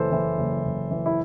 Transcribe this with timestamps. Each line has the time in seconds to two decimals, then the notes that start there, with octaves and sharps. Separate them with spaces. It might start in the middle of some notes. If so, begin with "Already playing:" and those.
Already playing: F#1 E3 A4 C5
0.12 E3
0.38 F#1
0.65 F#1
0.91 E3
1.06 E4